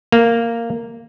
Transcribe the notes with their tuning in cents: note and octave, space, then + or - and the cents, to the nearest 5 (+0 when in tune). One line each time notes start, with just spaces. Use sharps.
A#3 -10